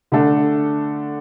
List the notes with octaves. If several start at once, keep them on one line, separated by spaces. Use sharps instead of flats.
D3 A3 D4 A4